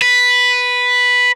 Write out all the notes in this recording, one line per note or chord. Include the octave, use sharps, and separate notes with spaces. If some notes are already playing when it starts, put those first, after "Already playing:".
B4